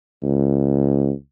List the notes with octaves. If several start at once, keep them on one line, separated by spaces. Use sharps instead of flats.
C#2